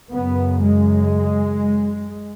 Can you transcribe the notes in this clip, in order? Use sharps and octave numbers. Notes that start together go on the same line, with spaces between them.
F#2 C#3 B3
G#3